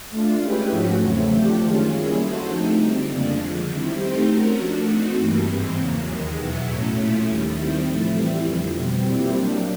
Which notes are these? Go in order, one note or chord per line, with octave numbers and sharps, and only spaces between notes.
A3 D4 F4
G#3 C#4 E4 G4 B4
G#2 F3 A3 C#4 F#4
E2 C#3 F#3 A3 C4
F3 A3 D4 G4
F#2 D#3 G#3 C#4 F4
G3 A#3 C#4 E4 G#4
G#3 C#4 F#4 A4 C5
D3 F3 A3 C4 D#4
D3 G3 C4
F2 C#3 F3 A#3 D4
D3 F3 G#3
D#3 G3 C4 E4
A3 C4 D#4 G4 C5
A3 C#4 F#4 A#4
F3 A3 D4 F#4
A3 C4 D#4 F#4
G2 E3 G3 A#3
G#2 E3 G#3 C4
E2 C#3 F#3 A#3
D#2 D#3 G#3
E2 B2 F#3 B3 E4
A2 F#3 A3 C#4
A#2 F3 A3 C#4 E4
D#2 D#3 G3
D#3 G3 C4 E4
A2 F3 A3
E3 G3 C4 E4
F2 D3 F3
B2 G3 C4
A#2 G3 C4 E4 G4
F#3 A#3 D4